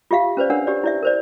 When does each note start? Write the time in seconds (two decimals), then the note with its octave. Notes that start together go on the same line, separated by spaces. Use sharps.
0.11 F4 G4 E5 F5
0.37 C#4 B4 C5 D5
0.50 D4 A#4 C#5 F#5 E6
0.67 G4 D5
0.84 E4 D5 E5
1.03 A#4 C5 D5